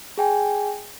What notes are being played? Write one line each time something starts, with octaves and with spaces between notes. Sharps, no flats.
G#4 G5 G#5